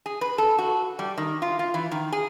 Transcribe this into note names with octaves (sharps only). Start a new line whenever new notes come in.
G#4
B4
A4
F#4
G3
D#3
F4
F4
E3
D#3
G#4